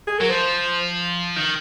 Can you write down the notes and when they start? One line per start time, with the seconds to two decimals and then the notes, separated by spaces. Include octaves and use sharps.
0.07 G#4
0.19 F#3 A#4
0.29 F3 C5
1.36 D#3